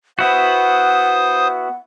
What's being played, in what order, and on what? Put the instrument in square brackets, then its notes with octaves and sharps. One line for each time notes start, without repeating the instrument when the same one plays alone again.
[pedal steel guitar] B3 E4 F#4 [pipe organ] C5 D#6 [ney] F#5